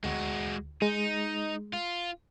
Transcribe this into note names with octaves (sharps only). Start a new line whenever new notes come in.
D2 G#3 F#4
G#3 D#4
F4